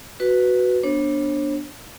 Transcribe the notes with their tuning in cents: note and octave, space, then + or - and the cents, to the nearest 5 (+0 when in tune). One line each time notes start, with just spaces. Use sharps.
F#4 +0 B4 +0
B3 -15 D4 +0 C#5 -45